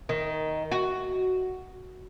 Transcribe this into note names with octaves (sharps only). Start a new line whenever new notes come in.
D#3
F#4